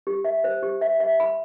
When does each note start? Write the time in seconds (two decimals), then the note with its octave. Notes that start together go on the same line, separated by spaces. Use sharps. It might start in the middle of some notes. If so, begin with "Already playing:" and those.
0.07 G4
0.25 E5
0.44 C5
0.63 G4
0.81 E5
1.00 E5
1.20 B5